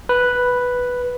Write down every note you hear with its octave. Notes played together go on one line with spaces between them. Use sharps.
B4